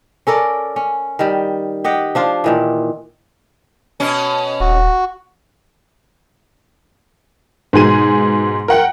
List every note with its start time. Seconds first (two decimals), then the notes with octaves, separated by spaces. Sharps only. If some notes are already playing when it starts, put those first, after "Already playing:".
0.27 C#4 A4 A#4 D5
0.76 C#4
1.19 D#3 G3
1.84 G4 D#5 F#5 G5
2.15 F3 D4 F4
2.44 A#2 D#3 E3
4.00 B2 C#4
4.60 D#1 F#4
7.73 G#2 B2 G#4 D#7
8.68 A#4 F#5 G5